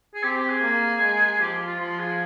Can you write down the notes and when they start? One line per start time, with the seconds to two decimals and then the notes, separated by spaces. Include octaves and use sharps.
0.14 G#4
0.23 C4 G4
0.36 G4
0.49 G#4
0.62 A#3
1.01 G#3
1.32 G#4
1.41 F3 G4
1.67 F4
1.80 F3 F4
1.99 G#4